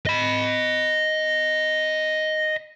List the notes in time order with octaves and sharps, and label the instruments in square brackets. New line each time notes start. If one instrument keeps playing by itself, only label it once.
[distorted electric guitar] D#5 B5